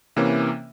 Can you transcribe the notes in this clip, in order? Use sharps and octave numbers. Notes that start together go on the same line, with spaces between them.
C3 E3 A#3 C#4